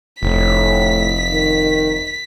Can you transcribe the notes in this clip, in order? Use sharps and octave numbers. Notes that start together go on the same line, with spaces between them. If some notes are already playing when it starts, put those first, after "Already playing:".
F1 A2 B6
D#3